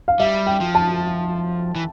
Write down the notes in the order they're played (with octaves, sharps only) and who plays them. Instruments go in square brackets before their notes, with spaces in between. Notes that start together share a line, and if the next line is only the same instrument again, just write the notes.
[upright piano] F5
[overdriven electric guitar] G3 [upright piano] E5
[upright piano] G5
[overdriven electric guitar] F3
[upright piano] A5
[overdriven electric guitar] E3